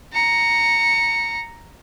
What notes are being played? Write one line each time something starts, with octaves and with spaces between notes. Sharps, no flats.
A#5 C#7